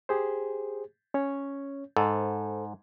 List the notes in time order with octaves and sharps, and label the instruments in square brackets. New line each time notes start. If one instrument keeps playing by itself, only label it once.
[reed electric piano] G4 G#4 C5
C#4 C#5
[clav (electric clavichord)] G#2 [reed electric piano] A4 C5